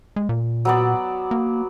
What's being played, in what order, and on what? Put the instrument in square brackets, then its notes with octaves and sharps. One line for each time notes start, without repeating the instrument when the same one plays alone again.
[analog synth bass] G#3
A#2
[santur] F#3 B3 D5
[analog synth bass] A#3